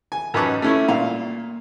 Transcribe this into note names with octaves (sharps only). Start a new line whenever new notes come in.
G#5
F#2 C#4 D#4 B4 A5 D6
A3 C#4 E4
A#2 F5